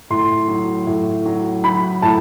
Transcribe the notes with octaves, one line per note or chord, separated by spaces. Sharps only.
A2 C6
F#3
A2
F#3
F#3 B5
A2 A5